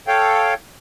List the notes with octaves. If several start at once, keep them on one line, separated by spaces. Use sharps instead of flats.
A4 C#5 F5 G5